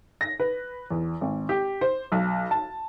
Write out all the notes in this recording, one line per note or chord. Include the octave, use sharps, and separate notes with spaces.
A#6
B4
E2
G#1
G4
C5
B1
A5